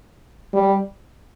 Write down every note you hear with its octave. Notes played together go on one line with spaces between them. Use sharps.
G3